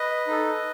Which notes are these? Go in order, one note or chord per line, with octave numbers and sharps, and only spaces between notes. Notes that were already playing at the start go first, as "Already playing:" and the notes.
Already playing: B4 D#5
D#4 A4